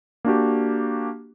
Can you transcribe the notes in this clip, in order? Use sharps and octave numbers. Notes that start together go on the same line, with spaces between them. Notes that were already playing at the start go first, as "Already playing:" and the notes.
A#3 D4 F#4 G4